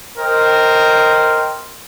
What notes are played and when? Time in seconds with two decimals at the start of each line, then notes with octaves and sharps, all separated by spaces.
0.18 A#4 C5 D#5 G5